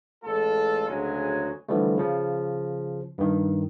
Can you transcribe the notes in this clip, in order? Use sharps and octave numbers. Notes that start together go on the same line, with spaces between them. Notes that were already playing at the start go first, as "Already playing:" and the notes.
A1 G#3 F4 A4
D2 C#3 F#3 G#3 G#5
D3 E3 F3 G3 A3
C#3 F3
G2 D#3